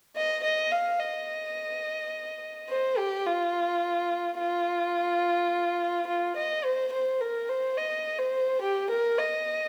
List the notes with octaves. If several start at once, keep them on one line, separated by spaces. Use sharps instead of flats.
D#5
D#5
F5
D#5
C5
G4
F4
F4
F4
D#5
C5
C5
A#4
C5
D#5
C5
G4
A#4
D#5